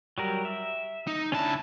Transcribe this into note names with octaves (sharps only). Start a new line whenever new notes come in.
F#3 G3 A#4
E5
D#4
C#2 C#4 D4 E4 A5